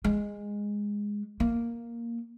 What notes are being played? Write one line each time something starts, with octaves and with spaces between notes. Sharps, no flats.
G#3
A#3